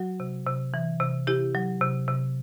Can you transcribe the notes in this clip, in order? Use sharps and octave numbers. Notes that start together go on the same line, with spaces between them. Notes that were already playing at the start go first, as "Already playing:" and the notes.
Already playing: F#3 F#4
C3
C3
E3
C3
C3 E4 G4
F#3
C3
C3